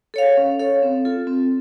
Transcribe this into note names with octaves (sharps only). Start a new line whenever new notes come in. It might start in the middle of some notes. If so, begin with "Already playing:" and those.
A4 C#5 F5
C#4
A4 C#5 F5
C4
F4 A4
C4